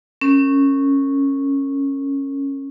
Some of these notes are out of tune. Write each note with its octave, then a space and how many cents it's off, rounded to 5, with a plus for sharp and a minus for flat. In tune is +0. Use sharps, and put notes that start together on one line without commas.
C#4 -10 A#4 -25